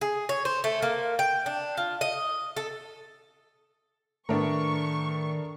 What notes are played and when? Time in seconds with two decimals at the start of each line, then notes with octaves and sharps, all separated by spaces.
0.01 G#4
0.29 C#5
0.45 C5
0.64 A3
0.82 A#3
1.19 G5
1.46 D4
1.77 F4
2.01 D#5
2.57 A4
4.29 A2 D#3 B3 D4 A#4 C#6